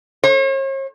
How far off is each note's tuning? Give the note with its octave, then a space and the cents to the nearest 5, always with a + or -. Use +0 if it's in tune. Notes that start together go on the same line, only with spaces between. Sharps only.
C#5 -45